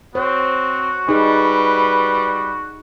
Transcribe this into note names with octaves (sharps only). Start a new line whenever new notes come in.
C4 F#4 C5 C#5
G3 D#4 G#4 B4